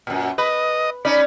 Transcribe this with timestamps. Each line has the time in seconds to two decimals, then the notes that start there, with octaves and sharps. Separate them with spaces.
0.07 F#2 A#2
0.38 B4 D#5
1.05 C#4 D#4 D5 B5